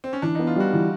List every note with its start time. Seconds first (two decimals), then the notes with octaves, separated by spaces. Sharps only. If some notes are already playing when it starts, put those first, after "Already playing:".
0.04 C4
0.13 C#4
0.22 E3 D4
0.35 B3 D#4
0.47 F4
0.56 G3 F#4
0.74 E3